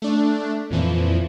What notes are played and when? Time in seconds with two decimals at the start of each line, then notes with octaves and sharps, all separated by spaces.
0.02 A3 D4
0.71 F2 A#2 E3 F3